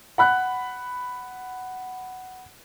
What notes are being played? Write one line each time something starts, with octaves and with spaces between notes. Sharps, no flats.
F#5 B5 F#6